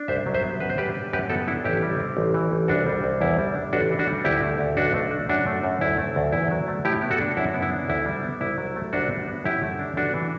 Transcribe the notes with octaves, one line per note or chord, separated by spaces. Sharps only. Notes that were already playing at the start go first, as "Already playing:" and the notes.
Already playing: D4
C2 C5 E5
F#3
C5 E5
B3
F#2 B4
C5
G3 G4 B4
D4
F#2 G4 B4
B3 F#4 A4
D4 E4
A1 E4 G4
G3
C4
A1
E3
A1
C2 D4 F#4
G3
C2
E2 E4
G3
D4
A1 D4 F#4
E3
D4 F#4
G3
D2 E4 G4
A3
D2
B1 D4 F#4
A3
D4
F#2 D4 F#4
A3
F#2
D2 E4
A3
D2
E2 E4
F#3
A3
A2 E4 G4
B3
F#4 A4
D4
F#2 E4
B3
E4
D4
D2 E4
G3
B3
C2 E4
F#3
A3
C2 D4 F#4
G3
B3
F#2 E4 G4
A3
D4
A1 D4 F#4
E3